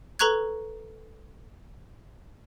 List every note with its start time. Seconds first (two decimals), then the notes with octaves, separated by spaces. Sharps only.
0.19 A4 B4 A#5 C#6 F#6 G#6